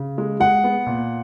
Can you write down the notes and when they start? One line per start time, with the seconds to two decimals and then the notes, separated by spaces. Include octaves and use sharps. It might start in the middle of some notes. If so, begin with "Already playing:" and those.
Already playing: C#3
0.18 G#3
0.40 G#3 F#5
0.64 B3
0.87 A#2